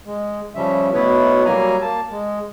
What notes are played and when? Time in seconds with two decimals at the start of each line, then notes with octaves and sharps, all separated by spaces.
0.05 G#3
0.55 C#3 F3 G3 C#4 E5
0.93 D2 B2 B3 E4 B4 C#5
1.45 F#3 G3 A#3 G#5 A#5
1.82 A#3 A5
2.11 G#3